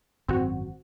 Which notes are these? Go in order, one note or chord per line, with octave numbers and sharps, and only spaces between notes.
G#1 F#2 C4 F#4